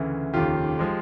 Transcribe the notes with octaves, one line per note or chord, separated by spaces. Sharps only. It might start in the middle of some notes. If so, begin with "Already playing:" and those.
Already playing: D2 C#3 E3
F1 D#2 C#3 F4 G4
F3 G#3